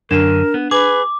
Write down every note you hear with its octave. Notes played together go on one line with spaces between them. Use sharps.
F#2 D3 D4 A#4 E7
B3
G#4 B4 D6